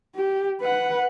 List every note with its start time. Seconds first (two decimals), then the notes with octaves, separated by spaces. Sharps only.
0.16 G4
0.61 B4 F#5